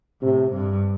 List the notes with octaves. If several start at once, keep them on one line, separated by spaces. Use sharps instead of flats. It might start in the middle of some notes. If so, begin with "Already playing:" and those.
A2 C3
G2